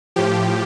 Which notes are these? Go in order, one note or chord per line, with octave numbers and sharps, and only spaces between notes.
A2 F3 G4